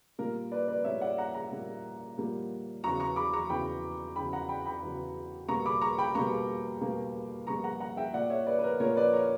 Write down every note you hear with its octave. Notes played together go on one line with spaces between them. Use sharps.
A#2 G3 A#3 A#4
B4 D5
B4 D5
A#2 G3 A#3 C#5 E5
D5 F#5
F#5 A#5
F#5 A#5
A#2 G3 A#3
A#2 G3 A#3
E2 C#3 F#3 A#5 C#6
A#5 C#6
B5 D6
A#5 C#6
E2 C#3 F#3 G5 B5
E2 C#3 F#3 G5 B5
F#5 A#5
G5 B5
G5 B5
E2 C#3 F#3
B2 G3 A#3 A#5 C#6
B5 D6
A#5 C#6
G5 B5
B2 G3 A#3 A#5 C#6
B2 G3 A#3
B2 G3 A#3 A#5 C#6
F#5 A#5
F#5 A#5
E5 G5
A#2 A#3 D5 F#5
C#5 E5
B4 D5
B4
A#4
A#2 A#3 A#4 C#5
B4 D5
A#4 C#5